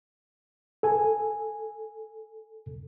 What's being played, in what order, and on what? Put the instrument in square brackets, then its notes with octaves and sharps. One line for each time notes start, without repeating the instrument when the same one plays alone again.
[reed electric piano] A4 G#5